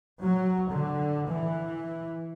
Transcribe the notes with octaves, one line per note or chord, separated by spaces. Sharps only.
F#3
D3
E3